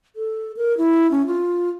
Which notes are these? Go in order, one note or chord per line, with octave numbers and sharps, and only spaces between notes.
A4
A#4
E4
C#4
F4